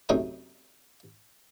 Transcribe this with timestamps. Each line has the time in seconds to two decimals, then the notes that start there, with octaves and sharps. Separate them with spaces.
0.09 F#2 C3 A3 D#4 G5 G#5